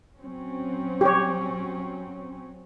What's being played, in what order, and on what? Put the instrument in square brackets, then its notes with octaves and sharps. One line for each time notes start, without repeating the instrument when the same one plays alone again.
[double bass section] F#3 C4 C#4
[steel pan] G4 C#5